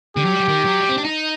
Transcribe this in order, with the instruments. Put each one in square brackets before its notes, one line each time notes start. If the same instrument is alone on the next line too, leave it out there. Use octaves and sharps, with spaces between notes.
[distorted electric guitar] D3 [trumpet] G4
[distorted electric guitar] F#3
G3
F#3
D#3
F#3
G3
C4
D4
D#4